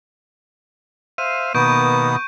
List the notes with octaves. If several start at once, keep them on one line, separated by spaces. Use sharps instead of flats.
C5 E5 F5 D#7
B2 D#3 A#3 B3 C#6 D#6 G6 D7